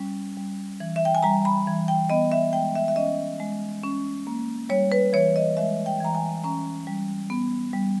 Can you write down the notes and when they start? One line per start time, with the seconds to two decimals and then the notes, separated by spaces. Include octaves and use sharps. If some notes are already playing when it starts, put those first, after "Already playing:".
Already playing: G3 C#4
0.37 G3
0.80 E3
0.96 E5
1.05 G5
1.15 G#5
1.23 G3 A#5
1.45 B5
1.67 E3
1.88 G5
2.10 B3 D#5
2.32 E5
2.53 G#3 G5
2.76 E5
2.88 E5
2.96 C#4 D#5
3.40 G#3
3.83 C#4
4.27 A#3
4.69 G3 C#5
4.92 B4
5.13 E3 C#5
5.36 D#5
5.57 G#3 E5
5.86 G5
6.00 E3 A#5
6.15 G#5
6.44 C#4 A#5
6.87 G3
7.30 B3
7.73 G3